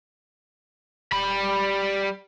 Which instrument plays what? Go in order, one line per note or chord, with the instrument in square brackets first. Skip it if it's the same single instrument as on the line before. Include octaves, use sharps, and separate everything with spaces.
[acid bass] D#1 [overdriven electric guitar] G3 B5